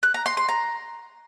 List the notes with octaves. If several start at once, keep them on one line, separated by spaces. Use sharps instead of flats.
F#6
A#5
C6
C6
A#5